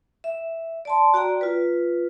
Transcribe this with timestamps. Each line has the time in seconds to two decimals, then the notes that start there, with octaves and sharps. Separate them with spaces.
0.24 E5
0.85 D5 A5 C6
1.14 F#4 D5 G5 A#5
1.41 F4 B4